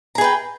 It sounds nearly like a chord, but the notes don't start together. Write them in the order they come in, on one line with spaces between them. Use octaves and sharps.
A#5 G#4 B4 G5